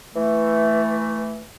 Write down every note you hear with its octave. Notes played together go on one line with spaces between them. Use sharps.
E3 A3